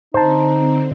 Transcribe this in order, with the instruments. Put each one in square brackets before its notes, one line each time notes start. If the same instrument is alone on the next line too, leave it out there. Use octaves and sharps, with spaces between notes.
[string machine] D3 C4 [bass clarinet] D#4 [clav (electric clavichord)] C5 A5